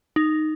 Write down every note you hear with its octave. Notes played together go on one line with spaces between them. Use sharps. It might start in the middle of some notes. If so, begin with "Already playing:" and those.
D#4